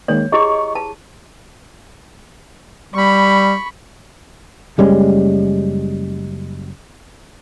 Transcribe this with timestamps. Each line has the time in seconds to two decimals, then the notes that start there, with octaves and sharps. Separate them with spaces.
0.08 D#3 G#3 A#3 C#5
0.32 E4 G4 G#4 D#5 C#6
0.75 A5
2.94 G3 B5 C#6
4.78 F#1 G3 G#3 C#4